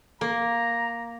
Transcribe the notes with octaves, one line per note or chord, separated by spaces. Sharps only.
A#3 A#5